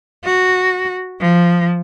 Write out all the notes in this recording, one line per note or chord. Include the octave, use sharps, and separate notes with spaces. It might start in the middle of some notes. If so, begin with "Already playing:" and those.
F#4
F3